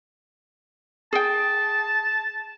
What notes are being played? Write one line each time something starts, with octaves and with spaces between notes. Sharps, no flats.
G#4 G5 A5